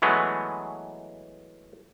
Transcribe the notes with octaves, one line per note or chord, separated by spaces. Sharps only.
E3 F#3 G#3 A3 B3